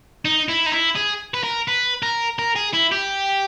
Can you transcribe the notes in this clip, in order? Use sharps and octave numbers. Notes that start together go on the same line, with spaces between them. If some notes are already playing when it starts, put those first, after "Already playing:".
D#4
E4
D#4
E4
G#4
B4
A#4
B4
A#4
A#4
G#4
E4
G4